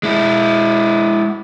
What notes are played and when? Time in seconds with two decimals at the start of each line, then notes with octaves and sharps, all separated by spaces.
0.03 G#3 E4